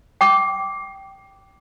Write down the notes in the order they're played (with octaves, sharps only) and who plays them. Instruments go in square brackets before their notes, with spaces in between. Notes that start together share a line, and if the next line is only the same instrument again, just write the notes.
[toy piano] G5 D6